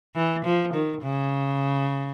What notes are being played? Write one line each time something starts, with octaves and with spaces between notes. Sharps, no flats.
E3
F3
D#3
C#3